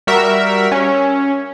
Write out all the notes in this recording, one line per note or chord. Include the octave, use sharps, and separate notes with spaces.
G3 F#4 A#4 E5
C#4